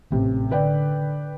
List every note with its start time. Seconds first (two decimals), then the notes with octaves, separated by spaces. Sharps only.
0.12 A1 C3
0.51 D3 B4 D5 G5